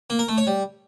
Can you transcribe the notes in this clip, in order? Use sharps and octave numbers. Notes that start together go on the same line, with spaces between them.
A#3
A#4
A3
C#5
G3